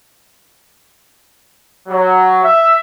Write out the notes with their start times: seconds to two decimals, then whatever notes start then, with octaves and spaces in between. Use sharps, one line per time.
1.88 F#3
2.43 E5